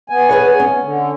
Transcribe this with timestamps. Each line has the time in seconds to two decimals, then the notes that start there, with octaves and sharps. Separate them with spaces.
0.10 B3 G#5
0.29 G#4 B4 C#5
0.60 C#4
0.83 D3